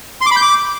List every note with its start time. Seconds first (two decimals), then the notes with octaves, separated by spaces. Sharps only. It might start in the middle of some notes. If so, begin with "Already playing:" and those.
0.21 C6
0.26 D6
0.31 B5
0.36 G6
0.42 D6